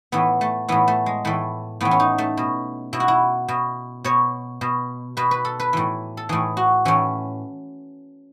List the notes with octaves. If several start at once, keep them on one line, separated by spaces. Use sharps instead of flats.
A2 E3 B3
A3
A2 E3 B3
A3
G#3
A2 E3 A3
A2 E3 B3
C#4
D#4
A3
B2
B2 E4
F#4
E4
B2
B2 C#5
B2
B2 B4
B4
A4
B4
A2 E3
A4
A2 E3 G#4
F#4
A2 E3 C#4